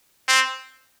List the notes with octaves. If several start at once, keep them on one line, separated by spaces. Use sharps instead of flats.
C4